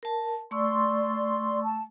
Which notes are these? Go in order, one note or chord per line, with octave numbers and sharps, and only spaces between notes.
A#4 A5
A3 D5 C6 C#6 E6
A5